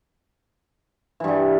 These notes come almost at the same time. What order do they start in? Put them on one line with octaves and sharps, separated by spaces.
E3 G2 G3